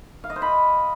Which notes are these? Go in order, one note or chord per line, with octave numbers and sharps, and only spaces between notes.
F5
D#5
C5
B5